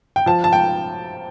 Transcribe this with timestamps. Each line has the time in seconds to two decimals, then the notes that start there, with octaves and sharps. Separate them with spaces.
0.16 G5
0.26 F3 A5
0.44 A5
0.53 G5